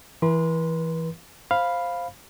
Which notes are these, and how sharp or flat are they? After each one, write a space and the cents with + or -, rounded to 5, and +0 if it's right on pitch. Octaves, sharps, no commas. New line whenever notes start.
E3 +0 B4 -40 C6 -10
C5 +0 F5 +0 B5 +0